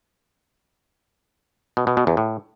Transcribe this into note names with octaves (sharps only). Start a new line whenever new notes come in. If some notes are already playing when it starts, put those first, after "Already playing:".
B2
B2
B2
E2
A2